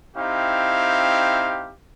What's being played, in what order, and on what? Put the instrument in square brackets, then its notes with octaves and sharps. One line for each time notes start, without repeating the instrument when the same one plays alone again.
[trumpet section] C4 D#4 E4 G4 F5